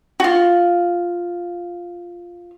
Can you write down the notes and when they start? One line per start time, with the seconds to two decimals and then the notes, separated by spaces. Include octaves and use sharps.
0.20 F4 F#4